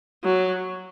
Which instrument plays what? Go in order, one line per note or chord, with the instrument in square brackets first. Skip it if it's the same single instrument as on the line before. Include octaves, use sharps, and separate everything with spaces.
[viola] F#3